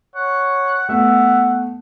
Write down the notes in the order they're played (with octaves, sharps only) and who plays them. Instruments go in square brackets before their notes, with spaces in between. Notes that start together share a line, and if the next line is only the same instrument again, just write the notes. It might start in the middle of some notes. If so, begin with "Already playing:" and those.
[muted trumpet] C#5 [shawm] F#5
[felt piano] A3 B3 [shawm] E5 [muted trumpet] F#5